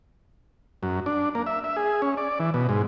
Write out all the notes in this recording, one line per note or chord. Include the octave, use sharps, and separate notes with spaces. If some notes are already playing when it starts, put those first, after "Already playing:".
F#2
D4
A#3
E5
E5
G#4
C#4
D5
E3
B2
G#2